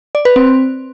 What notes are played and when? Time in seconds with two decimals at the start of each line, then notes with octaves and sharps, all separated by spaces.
0.15 D5
0.25 B4
0.36 C4